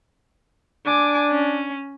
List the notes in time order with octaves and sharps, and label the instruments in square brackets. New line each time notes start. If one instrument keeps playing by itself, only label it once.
[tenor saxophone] D4 [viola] G#5 D6
[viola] C#4